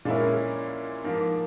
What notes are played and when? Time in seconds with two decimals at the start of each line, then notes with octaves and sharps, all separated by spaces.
0.05 A#2 G#3 C#4 E4 A#4
1.04 G#2 F3 A#3